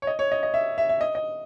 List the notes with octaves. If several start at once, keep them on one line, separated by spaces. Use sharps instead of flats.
C#5
D#5
C#5
D#5
D#5
E5
E5
E5
D#5
D#5